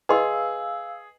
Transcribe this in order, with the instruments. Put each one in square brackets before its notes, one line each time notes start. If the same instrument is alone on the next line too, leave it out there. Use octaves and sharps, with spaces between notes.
[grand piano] G#4 [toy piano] B4 D#5 C6 [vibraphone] F5 E6